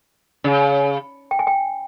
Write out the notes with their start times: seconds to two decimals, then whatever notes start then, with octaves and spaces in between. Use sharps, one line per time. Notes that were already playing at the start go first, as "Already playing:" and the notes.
0.44 C#3
1.31 G5
1.39 G#5
1.47 G5